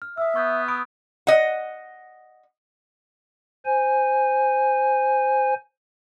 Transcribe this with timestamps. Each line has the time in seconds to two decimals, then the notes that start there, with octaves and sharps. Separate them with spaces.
0.02 F6
0.18 E5 D#6 E6
0.36 B3 C#6 G6
0.68 B5 D#6 D7
1.27 D#5 F#5
3.65 C5 G#5